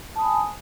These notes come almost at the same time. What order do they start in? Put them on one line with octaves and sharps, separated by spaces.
A5 D#6 B5 G#5